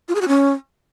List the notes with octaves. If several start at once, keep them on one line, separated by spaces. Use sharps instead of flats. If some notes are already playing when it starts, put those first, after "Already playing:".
F4
G#4
F#4
C#4